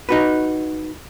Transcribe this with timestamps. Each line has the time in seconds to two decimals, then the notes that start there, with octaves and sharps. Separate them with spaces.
0.09 D#4 F#4 B4